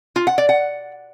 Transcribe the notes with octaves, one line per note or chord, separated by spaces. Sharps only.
F4
F#5
D5
F#5